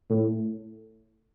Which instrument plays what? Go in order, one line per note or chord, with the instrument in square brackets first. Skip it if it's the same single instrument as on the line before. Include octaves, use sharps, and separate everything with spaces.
[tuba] A2